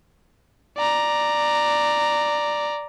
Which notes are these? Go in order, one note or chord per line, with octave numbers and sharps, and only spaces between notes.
D5 A#5